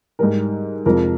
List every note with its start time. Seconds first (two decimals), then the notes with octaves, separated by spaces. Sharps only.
0.19 G#2 G3 A#4
0.86 F2 C3 F3 G#3 A#4